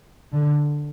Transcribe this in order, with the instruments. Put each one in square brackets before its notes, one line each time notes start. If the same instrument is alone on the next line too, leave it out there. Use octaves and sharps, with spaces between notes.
[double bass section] D3